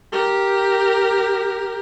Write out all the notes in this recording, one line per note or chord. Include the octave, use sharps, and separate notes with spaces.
G4 A#4